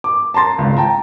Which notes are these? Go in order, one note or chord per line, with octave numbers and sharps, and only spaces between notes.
D6
A5 A#5 C6 A6
G#1 C#2
G5 A5 A#5